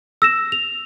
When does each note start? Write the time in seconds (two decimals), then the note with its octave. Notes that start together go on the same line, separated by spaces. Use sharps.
0.22 E6 A#6 E7
0.52 F7